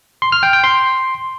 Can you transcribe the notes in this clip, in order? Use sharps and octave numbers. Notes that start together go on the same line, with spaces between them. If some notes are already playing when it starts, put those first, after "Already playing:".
C6
F6
G5
G5
C6